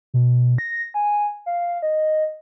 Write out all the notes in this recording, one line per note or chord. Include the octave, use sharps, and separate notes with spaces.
B2
A#6
G#5
F5
D#5